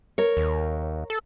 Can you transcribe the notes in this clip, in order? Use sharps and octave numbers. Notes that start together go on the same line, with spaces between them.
A#4 C#5
D#2
A4